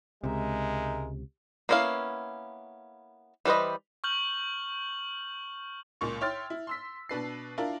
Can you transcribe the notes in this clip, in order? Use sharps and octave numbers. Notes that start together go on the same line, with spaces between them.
C#2 C3 G#3 D#4 A#4 E5
A#3 B3 C#4 E4 F5
E3 G3 B4 C5 D#5
C#6 F6 G6 F#7
C#2 A#2 C#6
C#5 E5 G5 C6 F6 A6
E4
C6 E6 B6
B2 D4 B4 C7
D4 E4 F4 A#4